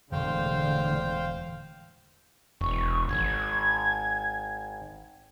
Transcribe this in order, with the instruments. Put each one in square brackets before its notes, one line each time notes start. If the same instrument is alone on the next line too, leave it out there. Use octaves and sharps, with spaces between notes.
[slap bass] E1 [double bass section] A2 D3 [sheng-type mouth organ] C5 F5 G5
[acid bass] E1 [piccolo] C#6
[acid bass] G#1 [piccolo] G#6